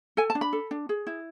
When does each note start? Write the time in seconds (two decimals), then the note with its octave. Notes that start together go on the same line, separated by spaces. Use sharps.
0.17 A4 G#5
0.30 A5
0.35 D4
0.41 B5
0.53 A4
0.71 D4
0.89 G#4
1.07 E4